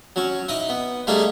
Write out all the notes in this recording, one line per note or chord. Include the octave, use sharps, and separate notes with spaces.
F#3 C#4
D#4 E4 D#5 D#6
B3
G3 A3 A#3 D4 D#4 G#4